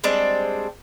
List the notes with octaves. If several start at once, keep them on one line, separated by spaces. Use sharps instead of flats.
G3 G#3 C4 D4